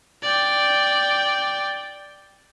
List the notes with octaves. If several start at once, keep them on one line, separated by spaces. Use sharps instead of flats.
D5 G5